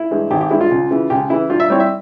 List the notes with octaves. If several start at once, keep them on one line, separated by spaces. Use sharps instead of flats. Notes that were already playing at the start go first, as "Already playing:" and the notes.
Already playing: E4
G2 E3 G#3
G#1 G4
G4
G2 E3 G#3 E4
F4
C#2
C#3 E3
C#2 G4
C#3 E3 E4
G2 F4
E5
G3 C4 E4 C#5
E5